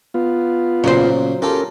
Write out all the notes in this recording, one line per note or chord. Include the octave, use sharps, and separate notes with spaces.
B3 F4
A#2 C#3 F#3 C5
C#4 F4 G4 A4 A#4